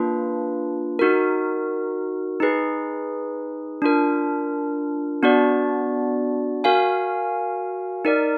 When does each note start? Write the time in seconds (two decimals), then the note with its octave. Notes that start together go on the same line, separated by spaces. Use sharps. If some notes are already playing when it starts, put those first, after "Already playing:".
Already playing: A#3 D4 F4 B4
0.99 D#4 F#4 A#4
2.40 D#4 G#4 B4
3.82 D4 F4 A#4
5.23 B3 D4 F#4 D5
6.64 F#4 A#4 F5 G#5
8.05 D#4 A#4 D5